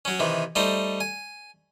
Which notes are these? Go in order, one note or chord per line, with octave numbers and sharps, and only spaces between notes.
F#3 C#4
C3 D#3 E3
G3 A3 D#4 C5
G#5